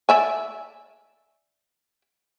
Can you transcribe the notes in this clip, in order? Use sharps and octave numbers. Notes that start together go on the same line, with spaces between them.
D5 E5 G#5